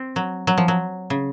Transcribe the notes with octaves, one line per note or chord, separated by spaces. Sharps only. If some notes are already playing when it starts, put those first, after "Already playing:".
Already playing: C4
F#3
F#3
F3
F#3
C#3